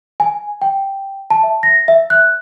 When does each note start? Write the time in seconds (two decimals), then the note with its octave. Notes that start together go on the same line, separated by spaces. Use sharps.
0.20 G#5
0.62 G5
1.30 A5
1.43 E5
1.63 A#6
1.88 E5
2.10 F#6